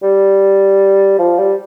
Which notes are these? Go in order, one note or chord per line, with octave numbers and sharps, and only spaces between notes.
G3
F3
G3